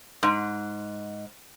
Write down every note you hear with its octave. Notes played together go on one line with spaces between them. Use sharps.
G#2